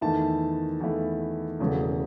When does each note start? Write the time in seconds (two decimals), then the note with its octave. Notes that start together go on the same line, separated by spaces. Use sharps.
0.01 E2 D#3 A3 E4 A5
0.80 E2 D#3 A3 E4
1.60 E1 E2 C#3 F#3 A3